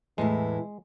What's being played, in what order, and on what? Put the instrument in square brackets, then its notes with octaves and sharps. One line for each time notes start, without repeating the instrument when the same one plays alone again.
[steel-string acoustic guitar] E2 A2 E4 [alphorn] E3 [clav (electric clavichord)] G#3